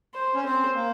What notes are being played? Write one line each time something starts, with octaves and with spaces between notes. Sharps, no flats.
C5
C#4
C4 C5
A#3